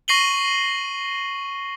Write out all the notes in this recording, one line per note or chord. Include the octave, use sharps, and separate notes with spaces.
C#6 A#6 C7 D#7 F#7 G7